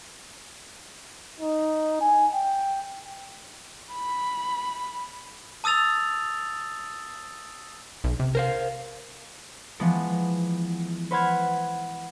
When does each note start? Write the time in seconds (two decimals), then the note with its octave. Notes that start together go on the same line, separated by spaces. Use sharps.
1.40 D#4
2.01 G#5
2.34 G5
3.93 B5
5.64 A5 D#6 E6 A6 F7
8.04 B1
8.20 C3
8.35 A#4 C5 F5
9.80 E3 F3 G#3 B3
11.11 B4 C5 F#5 B5 F6 G#6